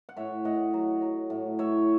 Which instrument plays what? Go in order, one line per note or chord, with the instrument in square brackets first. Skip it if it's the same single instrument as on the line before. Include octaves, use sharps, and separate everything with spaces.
[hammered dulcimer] F#5
A2 C#5 E5
A2 D#5 F#5
F#3
F#3
A2
A2 C#5 E5